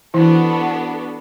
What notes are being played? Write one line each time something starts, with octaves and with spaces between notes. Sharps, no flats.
E3 B3 D4 E4 F#4 A4